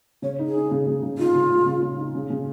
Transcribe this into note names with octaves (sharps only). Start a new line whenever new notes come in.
C#3 C#5
D#4
G#4
D#4
C#3
C#3
C#3
D#4 F4
C#3
C#3
C#3
C#3
D#4
C#3
C#3